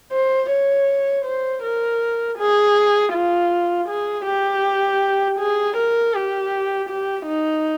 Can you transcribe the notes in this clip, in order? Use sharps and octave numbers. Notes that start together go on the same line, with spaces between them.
C5
C#5
C5
A#4
G#4
F4
G#4
G4
G#4
A#4
G4
G4
D#4